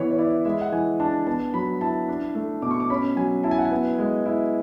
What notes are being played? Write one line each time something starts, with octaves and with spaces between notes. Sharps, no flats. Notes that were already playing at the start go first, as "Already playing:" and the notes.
Already playing: E3 B3 C#5
C#5
E4 D5
G#3 E5
F#5
E3 G#5
D4 A5
B3 A5
F#3 B5
E4 A5
D4
A3
B2 D6
C#6
D6
C#4 B5
F#3 G#5
E4 A5
G#5
F#5
G#5
B3
G#3
E4